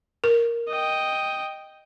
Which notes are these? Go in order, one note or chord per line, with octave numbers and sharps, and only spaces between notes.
A#4
D#5 G5